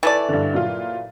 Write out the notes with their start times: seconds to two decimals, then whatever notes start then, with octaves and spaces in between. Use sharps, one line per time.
0.03 E3 A3 D5 A6
0.29 G2 D3
0.54 A#2 F#3 F4